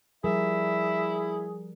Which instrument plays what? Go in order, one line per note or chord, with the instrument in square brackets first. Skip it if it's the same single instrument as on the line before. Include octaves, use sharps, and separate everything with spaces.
[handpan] F3 G3 A#4 [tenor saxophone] E4 [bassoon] G#4 [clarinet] E5